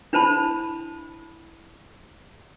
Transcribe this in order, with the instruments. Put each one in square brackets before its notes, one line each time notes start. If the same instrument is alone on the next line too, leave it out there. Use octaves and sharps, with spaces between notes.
[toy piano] D4 E4 C5 A5 B5